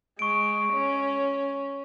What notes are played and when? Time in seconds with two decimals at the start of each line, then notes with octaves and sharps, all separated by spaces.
0.19 G#3 C#6 D7
0.73 C#4